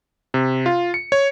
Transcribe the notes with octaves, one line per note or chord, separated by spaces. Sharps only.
C3
F4
C#7
C#5